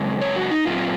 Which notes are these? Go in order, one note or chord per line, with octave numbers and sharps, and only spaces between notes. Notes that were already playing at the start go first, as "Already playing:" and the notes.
Already playing: F#2 C#3 G#3 C4
C#5
F#4
D#4
A#2 F#3 C4 F4